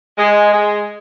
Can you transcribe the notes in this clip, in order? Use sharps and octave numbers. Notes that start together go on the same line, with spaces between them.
G#3
G#3